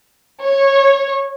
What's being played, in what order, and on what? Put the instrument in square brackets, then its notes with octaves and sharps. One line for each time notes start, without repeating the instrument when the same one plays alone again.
[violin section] C#5